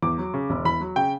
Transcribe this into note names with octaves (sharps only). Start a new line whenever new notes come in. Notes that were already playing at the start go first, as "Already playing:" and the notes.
E2 D6
F#3
C#3
E1
E2 B5
F#3
C#3 G5